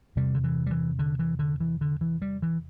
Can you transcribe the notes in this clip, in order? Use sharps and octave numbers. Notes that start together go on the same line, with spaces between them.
E2 C3 G3
D3
E3
G3
E3
D3
E3
D3
E3
D3
E3
G3
E3